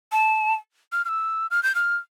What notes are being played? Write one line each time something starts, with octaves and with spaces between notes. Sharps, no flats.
A5
F6
F6
E6
F6
G6
F6